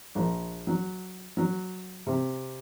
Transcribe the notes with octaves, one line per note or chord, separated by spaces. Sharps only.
A#1
F#3
F#3
C3